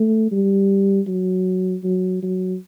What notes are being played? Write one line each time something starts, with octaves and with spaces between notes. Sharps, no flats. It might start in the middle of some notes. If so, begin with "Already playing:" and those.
Already playing: A3
G3
F#3
F#3
F#3